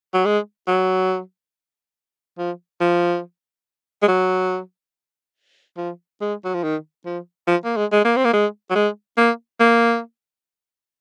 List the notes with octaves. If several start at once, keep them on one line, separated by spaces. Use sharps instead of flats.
F#3
G#3
F#3
F3
F3
G#3
F#3
F3
G#3
F#3
F3
D#3
F3
F3
A#3
G#3
G#3
A#3
C4
A#3
G#3
F#3
G#3
A#3
A#3